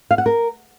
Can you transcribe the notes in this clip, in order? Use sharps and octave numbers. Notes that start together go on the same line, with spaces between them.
F5
F#5
A#4